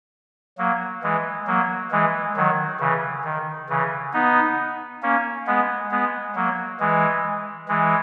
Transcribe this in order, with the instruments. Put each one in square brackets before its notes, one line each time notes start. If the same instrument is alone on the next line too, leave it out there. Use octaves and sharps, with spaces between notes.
[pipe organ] F#3 A#3
E3 G#3
F#3 A#3
E3 G#3
D#3 F#3
C#3 E3
D#3
C#3 E3
B3 D#4
A#3 C#4
G#3 B3
G#3 B3
F#3 A#3
E3 G#3
E3 G#3